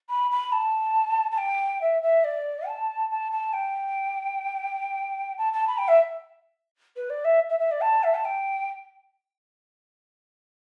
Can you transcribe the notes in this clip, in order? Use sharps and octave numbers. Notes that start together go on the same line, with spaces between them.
B5
B5
A5
A5
G5
E5
E5
D5
A5
A5
A5
G5
A5
A5
B5
G5
E5
B4
D5
E5
E5
E5
D5
A5
E5
A5
G5